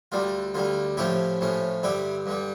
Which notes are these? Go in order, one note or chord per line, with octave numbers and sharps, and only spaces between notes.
D2 D3 G3 F4
D2 D3 G3 F4
A2 F3 A3 C#4 E4 G4
A2 F3 A3 C#4
G2 D3 G3 E4 G4
G2 D3 G3